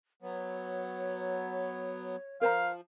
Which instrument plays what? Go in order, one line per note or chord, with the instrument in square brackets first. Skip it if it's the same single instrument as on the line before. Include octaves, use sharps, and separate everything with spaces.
[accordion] F#3 B3 [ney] C#5
[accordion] F3 [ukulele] A#4 C5 A#5 [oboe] F5